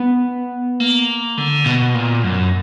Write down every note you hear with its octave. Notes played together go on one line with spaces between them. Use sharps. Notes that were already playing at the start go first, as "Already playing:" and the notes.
Already playing: B3
A#3
D3
B2
A#2
F#2